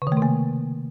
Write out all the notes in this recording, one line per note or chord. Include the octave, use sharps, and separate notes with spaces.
C#3
D#3
A3
C3
A#3